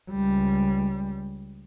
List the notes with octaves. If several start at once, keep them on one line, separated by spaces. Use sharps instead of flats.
C#2 G3